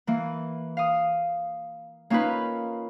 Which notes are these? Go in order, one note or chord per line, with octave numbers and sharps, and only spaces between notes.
E3 A#3
F5 D#6
A#3 C#4 D#4 F4 A#4 B4